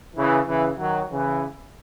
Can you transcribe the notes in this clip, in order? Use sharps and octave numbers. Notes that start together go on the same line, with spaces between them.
C#3 E3
C#3 E3
D#3 F#3
C#3 E3